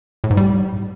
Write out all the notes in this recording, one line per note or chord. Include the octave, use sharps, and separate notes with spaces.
A2
G#2
G3